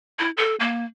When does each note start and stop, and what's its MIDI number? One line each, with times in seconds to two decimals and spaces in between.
0.19 0.30 64
0.37 0.55 69
0.60 0.84 58